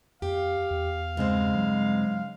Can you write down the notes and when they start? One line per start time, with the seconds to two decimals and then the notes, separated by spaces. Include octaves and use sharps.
0.22 F2 G4 F5
0.71 E2
1.17 G2 C#3 G#3 C4
1.56 F#3